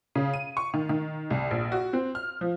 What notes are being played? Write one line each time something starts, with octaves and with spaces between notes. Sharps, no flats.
C#3
D#7
C#6
D#3
D#3
C2
A#1
F#4
C4
F6
F3